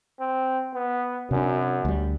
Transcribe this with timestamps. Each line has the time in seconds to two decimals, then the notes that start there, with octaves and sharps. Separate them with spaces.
0.20 C4
0.74 B3
1.31 F#2 C3 D4
1.85 D2 G3